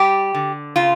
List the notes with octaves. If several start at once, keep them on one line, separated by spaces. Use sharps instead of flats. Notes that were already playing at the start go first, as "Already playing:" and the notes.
Already playing: G3 G4
D3
C#3 F4